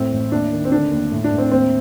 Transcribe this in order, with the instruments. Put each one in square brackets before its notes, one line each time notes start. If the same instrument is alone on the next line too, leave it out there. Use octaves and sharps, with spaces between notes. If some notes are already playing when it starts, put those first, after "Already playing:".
Already playing: [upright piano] A2 C4
A1
D#2 D4
D#3
C4
D3 D4
D#2
A2
D4
A2
C4
D#2 C4